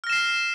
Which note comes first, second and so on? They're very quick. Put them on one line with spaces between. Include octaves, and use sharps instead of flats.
F6 A#6 E7 C7